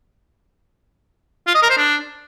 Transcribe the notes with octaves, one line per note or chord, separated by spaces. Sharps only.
F4
D#5
A#4
C5
D4